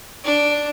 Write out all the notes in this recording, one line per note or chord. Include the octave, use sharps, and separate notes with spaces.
D4